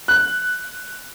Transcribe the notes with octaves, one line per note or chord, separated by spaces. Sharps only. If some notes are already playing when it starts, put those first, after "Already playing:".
F#6